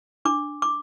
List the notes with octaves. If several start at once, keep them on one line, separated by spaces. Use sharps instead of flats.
D4 D6
D6